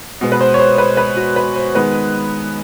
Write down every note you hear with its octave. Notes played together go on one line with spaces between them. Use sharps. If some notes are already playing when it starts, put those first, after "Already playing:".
B2 G#3 B3
B4
C5
C#5
C5
B4
B4
F#4
B4
C5
D#3 G#3 B3 B4